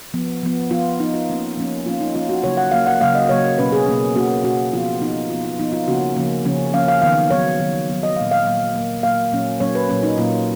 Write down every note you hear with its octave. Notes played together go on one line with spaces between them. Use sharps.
F3 B3
F3 B3
F3 B3 F4
F3 B3 D#4
F4
F3 A#3 C#4
F3 A#3 C#4
F3 A#3 C#4 F4
D#4
F3 A#3 C#4 F4
F#4
C#3 F#3 A#3 C#5
F#5
C#3 F#3 A#3 F5
F#5
C#3 F#3 A#3 F5
D#5
C#3 F#3 A#3 C#5
B2 A#3 C#4 B4
G#4
B2 A#3 C#4
B2 A#3 C#4 F#4
B2 A#3 C#4 F#4
F3 B3 F4
F3 B3 D#4
F3 B3 F4
F4
F3 B3 D#4
F4
C#3 F3 A#3 C#4 F#4
C#3 F3 A#3 C#4
C#3 F3 A#3 C#4
C#3 F3 A#3 C#4 F5
F5
D#3 F#3 B3 F5
D#3 F#3 B3 C#5
D#3 F#3 B3
D#3 F#3 B3
D#5
A#2 F#3 A#3 F5
F5
A#2 F#3 A#3
A#2 F#3 A#3
A#2 F#3 A#3 F5
A#2 F#3 A#3 C#4
A#2 F#3 A#3 C#4 C#5
B4
A#2 F#3 A#3 C#4
D#4
A#2 F#3 A#3 C#4 F4